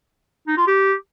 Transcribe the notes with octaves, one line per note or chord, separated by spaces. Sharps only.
D#4
F4
G4